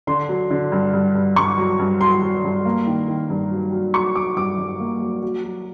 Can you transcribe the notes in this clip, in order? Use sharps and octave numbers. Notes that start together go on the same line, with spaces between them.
D3 C6
F#3
D3
G2
G2
G2
G2 C#6
F#3
G2
F#3 C6
F#3
G2
A#3
D#3
D#3
G2
F#3
F#3
F#3 C#6
F#3 D6
G2 D6
G2
A#3
F#3
F#3
F#3